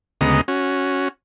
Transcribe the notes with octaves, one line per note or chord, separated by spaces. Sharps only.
D2 C#3 G#3 B3 D#5 A#5
C#4 F#4